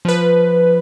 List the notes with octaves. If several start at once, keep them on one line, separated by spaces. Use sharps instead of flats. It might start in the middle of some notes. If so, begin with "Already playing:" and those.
F3 B4